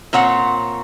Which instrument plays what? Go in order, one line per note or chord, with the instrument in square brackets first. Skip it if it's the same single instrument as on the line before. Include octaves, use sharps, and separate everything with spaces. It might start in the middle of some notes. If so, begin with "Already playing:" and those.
[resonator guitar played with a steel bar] A#2 C4 C#5 F#5